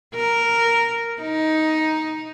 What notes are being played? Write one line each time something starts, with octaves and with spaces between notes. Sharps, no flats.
A#4
D#4